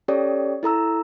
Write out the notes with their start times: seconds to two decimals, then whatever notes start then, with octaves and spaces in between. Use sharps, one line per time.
0.08 C#4 G4 A4 C#5 D5
0.63 E4 A4 A#5 E6